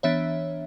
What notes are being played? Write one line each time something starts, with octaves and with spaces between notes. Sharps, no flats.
E3 B3 D4 C#5 E5